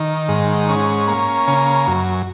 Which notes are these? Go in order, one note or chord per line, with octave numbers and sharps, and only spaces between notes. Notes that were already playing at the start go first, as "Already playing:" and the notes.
Already playing: D#3
G#2
C#4
A#3
C#3
F#2